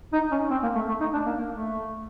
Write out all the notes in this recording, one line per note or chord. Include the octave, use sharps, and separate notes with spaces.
D#4
C#4
C4
A#3
A3
A3
D#4
D4
A#3
A#3
A3